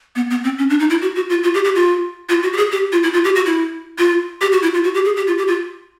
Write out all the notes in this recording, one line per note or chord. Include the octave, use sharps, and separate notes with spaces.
B3
B3
C4
C#4
D4
D#4
E4
F#4
F#4
F4
F4
G4
G4
F4
F4
F#4
G4
G#4
G4
F4
E4
F4
G4
F#4
E4
F4
G4
F#4
E4
F4
F#4
G4
G#4
G4
F4
G4
F4